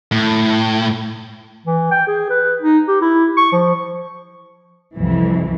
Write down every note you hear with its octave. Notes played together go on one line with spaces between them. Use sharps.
A2
E3
G5
G#4
B4
D#4
G4
E4
C#6
F3
C2 F2 E3